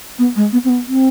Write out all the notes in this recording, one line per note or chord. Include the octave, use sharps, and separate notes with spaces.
B3
G#3
B3
C4
B3
C4